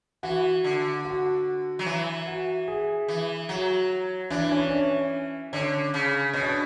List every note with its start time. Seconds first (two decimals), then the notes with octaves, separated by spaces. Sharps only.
0.23 E3 F#4
0.64 D3
1.05 F#4
1.79 F#3
1.86 E3
2.27 F#4
2.68 G#4
3.08 E3
3.49 F#3 F#4
4.30 E3 D4
4.43 D4
4.51 C#4
4.61 D4
4.71 C#4
5.53 D3 C#4
5.94 C#3
6.33 B2 C#4
6.45 D4